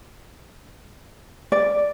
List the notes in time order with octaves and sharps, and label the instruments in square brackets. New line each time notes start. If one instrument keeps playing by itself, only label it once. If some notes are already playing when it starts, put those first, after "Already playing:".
[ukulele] D5